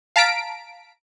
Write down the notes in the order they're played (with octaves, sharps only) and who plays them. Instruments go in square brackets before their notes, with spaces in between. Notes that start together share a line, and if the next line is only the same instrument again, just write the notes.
[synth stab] F5 A5 A#5 B6 D7